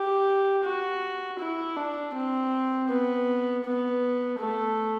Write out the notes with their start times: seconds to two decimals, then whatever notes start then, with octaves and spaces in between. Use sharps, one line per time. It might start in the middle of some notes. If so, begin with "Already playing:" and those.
Already playing: G4
0.64 F#4
1.39 E4
1.76 D4
2.14 C4
2.89 B3
3.64 B3
4.39 A3